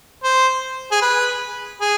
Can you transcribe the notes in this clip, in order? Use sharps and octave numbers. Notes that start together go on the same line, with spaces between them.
C5
G#4
B4
G#4